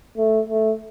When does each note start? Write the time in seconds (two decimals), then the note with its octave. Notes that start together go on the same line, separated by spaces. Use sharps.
0.17 A3
0.49 A3